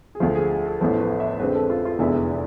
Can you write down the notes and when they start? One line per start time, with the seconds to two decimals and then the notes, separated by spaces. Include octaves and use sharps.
0.15 G#4
0.20 D2 D3 F3 F4
0.35 G#4
0.50 G#4
0.66 A4
0.80 A1 A2 F3 B3 A4
1.01 B4
1.20 E5
1.40 F2 D3 G#3 C4 B4
1.55 A4
1.70 F4
1.85 F4
1.99 F1 E2 D3 G#3 B3 E4
2.29 E4